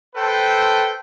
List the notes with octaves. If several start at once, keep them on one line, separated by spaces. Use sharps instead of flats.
A4 B4 C5 G5